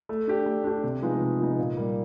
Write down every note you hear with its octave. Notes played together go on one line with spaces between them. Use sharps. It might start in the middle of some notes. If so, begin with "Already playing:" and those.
A3
D4 G4
A3
D4 G4
C3
F3 G#3 B3 D#4
C3
F3 G#3 B3 D#4
A#2
G3 A#3